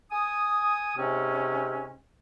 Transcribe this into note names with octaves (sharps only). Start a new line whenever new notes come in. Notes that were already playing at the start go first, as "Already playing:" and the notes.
G#5 D#6
G#2 C3 C4 C#4